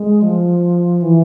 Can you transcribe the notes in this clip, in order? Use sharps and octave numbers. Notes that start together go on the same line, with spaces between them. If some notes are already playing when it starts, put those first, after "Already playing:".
Already playing: G#3
F3
E3